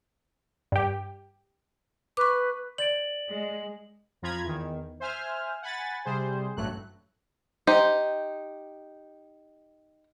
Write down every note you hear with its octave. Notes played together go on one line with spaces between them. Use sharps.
G2 G4
B4 C#6 D6
D5 A6 D7 F#7
G#3
F2 F3 F4 A#5 B5 G#6
E2 D#3
C5 E5 G#5 F6
F#5 G#5 B5 A6
C3 G3 G#4 C5
A1 G2 F#3 A3 F#6
D#4 G4 C5